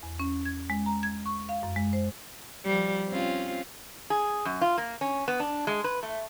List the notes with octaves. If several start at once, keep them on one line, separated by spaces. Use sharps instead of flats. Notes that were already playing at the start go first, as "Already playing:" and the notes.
E2
C#4
G#6
G#3
A#5
G#6
C#6
F5
F#2
G#3
C5
F3 G3
C4 C#4 F4
G#4
F#2
F4
A#3
C#4
B3
D4
G#3
B4
A3